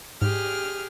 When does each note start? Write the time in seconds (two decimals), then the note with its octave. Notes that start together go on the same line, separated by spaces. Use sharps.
0.22 G#2 G4 G#4 F6